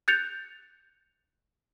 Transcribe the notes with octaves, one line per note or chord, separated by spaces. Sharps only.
F#6 G6 A6 C#7 F7